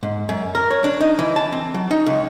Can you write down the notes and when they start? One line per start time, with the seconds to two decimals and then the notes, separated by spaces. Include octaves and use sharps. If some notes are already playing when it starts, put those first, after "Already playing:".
0.03 G#2
0.29 F#2
0.55 A#4
0.70 C#5
0.84 D4
1.01 D#4
1.19 E3
1.36 A5
1.52 C4
1.74 F#3
1.91 D#4
2.06 C#2